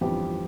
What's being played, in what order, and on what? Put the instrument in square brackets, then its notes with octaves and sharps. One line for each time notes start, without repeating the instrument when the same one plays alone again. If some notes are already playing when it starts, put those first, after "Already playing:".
[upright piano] G1 F2 E3 G4